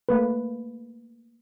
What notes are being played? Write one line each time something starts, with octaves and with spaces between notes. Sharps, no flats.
A3 A#3 B4